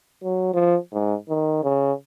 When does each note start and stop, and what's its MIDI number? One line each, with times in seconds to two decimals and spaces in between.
0.23 0.49 54
0.54 0.77 53
0.92 1.15 44
1.29 1.59 51
1.63 1.92 49